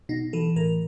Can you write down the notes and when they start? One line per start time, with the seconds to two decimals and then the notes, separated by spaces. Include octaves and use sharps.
0.09 B2 D#4
0.33 E3 A4
0.56 A2 A#4